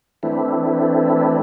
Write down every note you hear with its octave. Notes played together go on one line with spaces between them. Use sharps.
E3 A3 C4 D4 E4